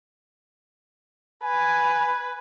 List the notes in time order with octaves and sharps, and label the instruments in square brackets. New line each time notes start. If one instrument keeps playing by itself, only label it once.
[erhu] B4 [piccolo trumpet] G#5